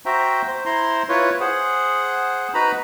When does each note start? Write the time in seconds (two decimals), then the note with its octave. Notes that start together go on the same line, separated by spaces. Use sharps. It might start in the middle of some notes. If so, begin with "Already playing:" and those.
0.06 F#4 C5 E5 G5 A#5
0.47 C5
0.65 E4 C5 A#5 C6
1.09 E4 F4 B4 C#5
1.40 G#4 C5 F#5
2.54 D#4 F#4 B4 A#5 B5